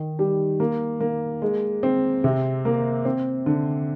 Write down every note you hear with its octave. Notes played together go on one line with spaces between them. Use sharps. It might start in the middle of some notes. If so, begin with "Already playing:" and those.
Already playing: D#3
G3
A#3
A#3
G#3
C4
C3
A#3
C4
D3